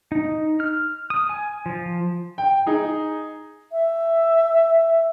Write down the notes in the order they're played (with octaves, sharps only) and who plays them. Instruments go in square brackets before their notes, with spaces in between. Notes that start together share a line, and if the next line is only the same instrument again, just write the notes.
[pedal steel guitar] D#4
F6
D#6
G#5
F3
[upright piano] G5
D#4 G#4
[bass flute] E5